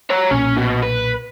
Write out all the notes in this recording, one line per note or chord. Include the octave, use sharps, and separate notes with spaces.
C#5 A#5
B1 A#2 C#4
B2
B4